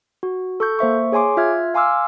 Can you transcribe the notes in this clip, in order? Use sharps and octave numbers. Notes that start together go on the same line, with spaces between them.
F#4
A4 C#6 G6
A#3 C5 E5 C#6
G#4 C#5 G#5 C6 D6
F4 E5 F6 G#6
F5 G#5 C6 D6 E6 F6